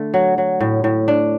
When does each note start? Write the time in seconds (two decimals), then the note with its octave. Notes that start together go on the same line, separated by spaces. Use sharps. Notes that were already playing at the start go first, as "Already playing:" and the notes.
Already playing: D3 A3
0.14 F#3
0.38 F#3
0.60 A2
0.84 A2
1.08 D4